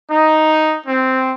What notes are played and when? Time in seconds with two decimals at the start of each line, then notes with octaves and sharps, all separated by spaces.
0.10 D#4
0.87 C4